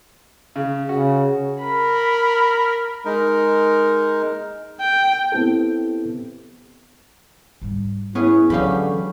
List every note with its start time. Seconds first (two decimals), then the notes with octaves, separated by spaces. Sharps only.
0.56 C#3
0.89 C#3 F#4
1.61 A#4 B5
3.05 G#3 D#4 A#4
4.80 G5
5.32 B3 C4 E4 G4 A4
7.62 G#2 G3
8.15 B3 C#4 E4 G#4 B4
8.50 D3 E3 F#3 G#3 C#4 G4 F5 B5